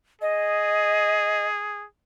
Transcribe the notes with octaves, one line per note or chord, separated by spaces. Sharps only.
G#4 D#5